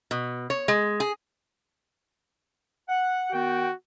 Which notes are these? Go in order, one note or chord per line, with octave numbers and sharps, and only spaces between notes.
B2
C#5
G#3
G#4
F#5
D#3 B3 F#4 G5